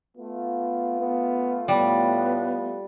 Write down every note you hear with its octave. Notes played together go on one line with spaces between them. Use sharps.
A3 B3 F4
B3
A2 G3 B3